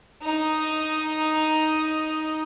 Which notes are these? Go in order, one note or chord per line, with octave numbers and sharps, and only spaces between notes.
D#4 D#5